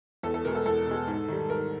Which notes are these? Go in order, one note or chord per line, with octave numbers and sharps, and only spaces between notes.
E2 A4
A4
B2 G#3 A#4
A4
E2 A4
B2 G#3
G#2
D#3 G3
G#2 A#4